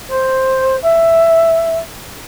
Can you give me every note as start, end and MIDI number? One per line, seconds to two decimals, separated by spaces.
0.08 0.75 72
0.82 1.77 76